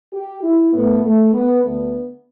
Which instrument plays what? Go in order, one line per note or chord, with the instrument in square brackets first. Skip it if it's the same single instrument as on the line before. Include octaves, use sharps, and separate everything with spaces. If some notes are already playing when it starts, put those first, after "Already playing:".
[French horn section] G4
E4
A2 A3 B3
A3
B3
D2 D3 A3 B3